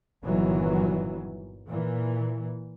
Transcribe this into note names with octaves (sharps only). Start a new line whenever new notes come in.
G1 A#2 D#3 E3 F#3
A#2 E3